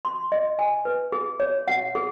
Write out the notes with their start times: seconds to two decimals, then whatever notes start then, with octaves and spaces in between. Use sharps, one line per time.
0.05 C6
0.32 D#5
0.59 G#5
0.85 B4
1.12 G#4
1.40 C#5
1.68 F#5
1.95 G#4